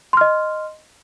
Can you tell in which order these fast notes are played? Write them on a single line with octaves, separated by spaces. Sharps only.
C6 F6 D#5